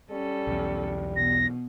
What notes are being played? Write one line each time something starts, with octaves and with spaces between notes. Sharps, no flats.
G3 C#4 A4
B1 E2
B2 A#6